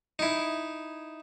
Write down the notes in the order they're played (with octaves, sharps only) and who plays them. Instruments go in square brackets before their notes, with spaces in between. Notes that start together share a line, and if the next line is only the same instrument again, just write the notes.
[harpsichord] D#4 E4